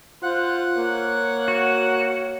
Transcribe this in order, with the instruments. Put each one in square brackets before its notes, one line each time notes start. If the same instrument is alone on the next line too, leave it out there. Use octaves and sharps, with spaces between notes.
[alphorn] F4 [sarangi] C5 [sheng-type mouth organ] F#5 F#6
[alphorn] A#3 [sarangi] C#5
[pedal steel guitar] F#4